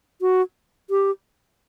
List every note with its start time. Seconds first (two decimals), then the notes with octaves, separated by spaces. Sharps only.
0.21 F#4
0.90 G4